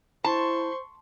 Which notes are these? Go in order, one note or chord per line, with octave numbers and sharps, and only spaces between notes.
E4 C5 A5 C6 C#6